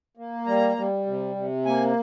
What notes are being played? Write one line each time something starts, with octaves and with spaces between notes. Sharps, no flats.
A#3
G3 A#5
G3
C3
C3
A#3 G#5